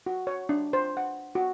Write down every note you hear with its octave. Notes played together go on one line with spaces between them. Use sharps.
F#4
C#5
D4
C5
F#5
F#4